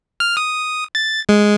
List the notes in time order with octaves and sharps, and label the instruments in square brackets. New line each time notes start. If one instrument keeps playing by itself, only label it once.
[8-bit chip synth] F6
D#6
A6
G#3